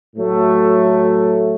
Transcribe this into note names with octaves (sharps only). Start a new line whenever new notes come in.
A2 F#3 A3